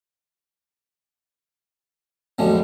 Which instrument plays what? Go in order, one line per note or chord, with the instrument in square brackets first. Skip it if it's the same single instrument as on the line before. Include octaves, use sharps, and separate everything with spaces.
[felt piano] F1 B1 [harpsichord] D3 G3 G#3